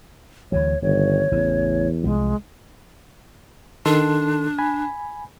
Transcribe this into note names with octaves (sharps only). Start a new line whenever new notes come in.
D2 E3 F#3 C#5
G1 D#3 G3 C#5
A1 E2 C#3 E3
C2 F3 G#3
D#3 D4 A4 C6
G#5 B5